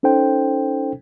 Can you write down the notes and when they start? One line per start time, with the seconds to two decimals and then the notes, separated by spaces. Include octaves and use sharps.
0.03 C#4 D#4 A4 C5 G5